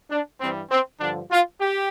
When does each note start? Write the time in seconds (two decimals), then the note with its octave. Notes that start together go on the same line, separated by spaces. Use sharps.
0.10 D4
0.39 G2 E3 G3 C4
0.70 C4
1.00 G2 D3 F3 D4
1.30 F4
1.60 G4